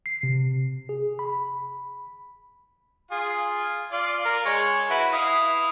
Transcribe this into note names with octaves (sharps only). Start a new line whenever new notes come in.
C7
C3
G#4
B5
F4 G#4
F4 D5
A#4
G#3 C#5
E4 F#4 B4
E4 F5 D#6